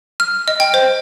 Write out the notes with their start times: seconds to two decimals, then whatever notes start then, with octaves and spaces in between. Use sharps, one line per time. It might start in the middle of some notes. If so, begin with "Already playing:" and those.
0.20 F6
0.48 D#5
0.60 G5
0.74 C5